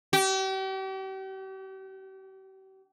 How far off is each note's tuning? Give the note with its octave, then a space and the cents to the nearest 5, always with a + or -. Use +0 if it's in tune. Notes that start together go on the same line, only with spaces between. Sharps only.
G4 -40